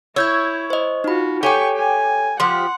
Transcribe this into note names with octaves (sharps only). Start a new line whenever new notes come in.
E4 C#5 E6 G6 G#6
C5 D#5
D#4 F4 F#4 B5
G4 A4 C#5 G5 G#5 C#6
G#5
F3 G4 F#5 C6